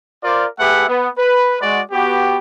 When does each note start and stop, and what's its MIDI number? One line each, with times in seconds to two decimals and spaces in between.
0.23 0.46 65
0.23 0.46 70
0.23 0.46 72
0.23 0.46 74
0.59 0.86 57
0.59 0.86 67
0.59 0.86 68
0.59 0.86 71
0.59 0.86 76
0.59 0.86 78
0.88 1.09 59
1.18 1.57 71
1.61 1.80 56
1.61 1.80 66
1.61 1.80 74
1.92 2.38 59
1.92 2.38 66
1.92 2.38 67